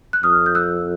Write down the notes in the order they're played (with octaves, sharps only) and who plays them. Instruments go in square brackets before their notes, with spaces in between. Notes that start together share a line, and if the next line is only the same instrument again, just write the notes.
[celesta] F#6
[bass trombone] F2 [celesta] D#6 F6
[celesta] G6
E6 F#6